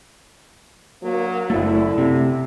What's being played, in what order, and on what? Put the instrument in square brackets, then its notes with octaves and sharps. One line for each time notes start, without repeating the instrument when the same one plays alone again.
[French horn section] D3 F#3 A#3
[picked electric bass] F#1 A3 [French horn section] D3 E4
[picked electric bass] C3